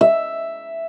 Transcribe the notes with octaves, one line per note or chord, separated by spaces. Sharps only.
E5